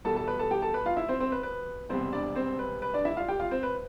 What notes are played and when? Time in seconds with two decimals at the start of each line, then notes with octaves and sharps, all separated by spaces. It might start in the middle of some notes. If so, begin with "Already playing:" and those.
0.05 E2 B2 G3 B3 A4 A5
0.16 A4 A5
0.28 B4 B5
0.39 A4 A5
0.51 G4 G5
0.62 A4 A5
0.74 B4 B5
0.85 F4 F5
0.97 E4 E5
1.08 C4 C5
1.20 C4 C5
1.32 B4
1.43 B4
1.89 E1 E2 C3 G3 B3 C4 C5
2.13 D4 D5
2.36 C4 C5
2.59 B4
2.82 B4
2.94 D4 D5
3.05 E4 E5
3.17 F4 F5
3.28 G4 G5
3.40 F4 F5
3.51 C4 C5
3.63 B4